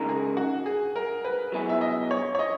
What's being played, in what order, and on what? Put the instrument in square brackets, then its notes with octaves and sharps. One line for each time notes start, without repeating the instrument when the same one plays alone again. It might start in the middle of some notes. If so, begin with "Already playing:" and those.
Already playing: [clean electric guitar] C#3 G#3 D#4 A#4
[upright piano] G#4
F#4
G#4
A#4
B4
[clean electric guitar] F#3 B3 E4 G#4
[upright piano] E5
D#5
C#5
C#5
D#5